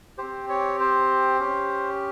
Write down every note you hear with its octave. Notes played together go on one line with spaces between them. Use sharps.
C4 G4 C5
C#5
C5
C#4 G4